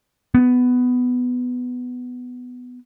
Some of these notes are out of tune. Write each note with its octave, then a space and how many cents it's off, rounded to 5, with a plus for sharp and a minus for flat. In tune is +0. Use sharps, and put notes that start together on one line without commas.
B3 +10